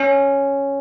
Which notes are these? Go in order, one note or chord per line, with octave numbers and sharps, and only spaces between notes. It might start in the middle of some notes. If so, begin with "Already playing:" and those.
Already playing: C#4